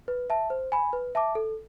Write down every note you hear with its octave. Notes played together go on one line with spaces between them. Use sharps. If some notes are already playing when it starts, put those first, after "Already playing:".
B4
E5 A5
C5
G#5 B5
B4
E5 A5 D6
A4